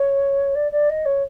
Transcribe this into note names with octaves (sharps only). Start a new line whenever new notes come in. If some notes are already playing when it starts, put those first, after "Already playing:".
Already playing: C#5
D5
D5
D#5
C#5